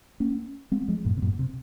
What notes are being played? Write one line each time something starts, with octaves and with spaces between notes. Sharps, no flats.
A#3 C#4
G#3 C4
F3 G#3
F#2 A#2
C3
F#2 A#2
C3